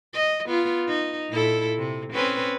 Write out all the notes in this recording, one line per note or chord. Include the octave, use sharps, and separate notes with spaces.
D#5
B3 F4
D#4
A#2 E4 A4
C3
C4 C#4 B4